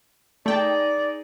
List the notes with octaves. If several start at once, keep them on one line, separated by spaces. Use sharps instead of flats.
A3 D#4 G#4 D5 G5 A5